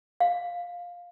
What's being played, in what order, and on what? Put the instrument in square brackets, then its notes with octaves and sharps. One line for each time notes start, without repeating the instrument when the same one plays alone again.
[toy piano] F5